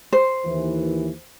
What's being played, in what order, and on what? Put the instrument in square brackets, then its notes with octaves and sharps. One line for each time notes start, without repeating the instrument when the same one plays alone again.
[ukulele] C5
[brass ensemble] D#2 E3